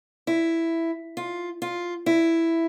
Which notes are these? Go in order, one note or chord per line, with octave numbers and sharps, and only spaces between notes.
E4
F4
F4
E4